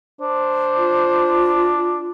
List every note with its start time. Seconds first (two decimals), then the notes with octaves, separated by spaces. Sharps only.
0.21 D4 C5
0.77 F4